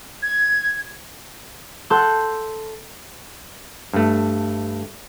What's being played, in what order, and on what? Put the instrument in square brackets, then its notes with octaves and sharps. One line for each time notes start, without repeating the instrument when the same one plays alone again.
[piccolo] G#6
[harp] A4 F#5 A5 C6 F#6 G6
[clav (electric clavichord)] G2 A3